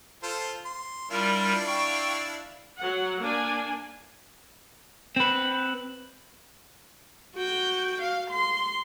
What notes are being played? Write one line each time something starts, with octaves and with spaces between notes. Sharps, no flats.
F4 A4 C5
C6
G3 D4 E4 F4 A#4 F5
G5 C#6
F#3 F#5
A#3 D4 G#5
C4 B4
F#4 G5
F5
C6